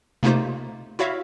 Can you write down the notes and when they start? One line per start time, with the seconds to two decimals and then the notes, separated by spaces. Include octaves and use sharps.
0.23 C3 A3 A#3 D#4 F4 C5
0.99 E4 F#4 C#5 E5 F5